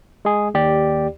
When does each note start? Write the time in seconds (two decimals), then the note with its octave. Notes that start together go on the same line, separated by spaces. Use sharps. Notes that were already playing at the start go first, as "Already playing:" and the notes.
0.25 G#3 G#4
0.54 D#2 G4 D5